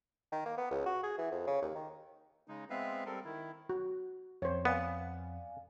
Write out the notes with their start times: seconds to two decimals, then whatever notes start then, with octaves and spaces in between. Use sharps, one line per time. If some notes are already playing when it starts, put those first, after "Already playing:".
0.32 D#3
0.45 A#3
0.57 B3
0.71 C#2
0.86 F#4
1.03 G#4
1.18 E3
1.32 F2
1.47 C#3
1.62 D#2
1.75 D#3
2.48 C#3 G#3 D#4
2.70 G#3 B3 C4 B4 E5 F5
3.06 G3 C4 A4 A#4
3.25 D#3 E4
3.69 F#4
4.42 F2 C5 C#5
4.65 B3 D5 F5 G#5